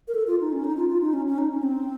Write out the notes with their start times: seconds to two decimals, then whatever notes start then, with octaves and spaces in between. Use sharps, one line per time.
0.08 A#4
0.15 A4
0.27 F4
0.40 D#4
0.52 C#4
0.64 D#4
0.77 F4
0.89 F4
1.02 D#4
1.13 C#4
1.27 C#4
1.38 D#4
1.51 C#4
1.63 C4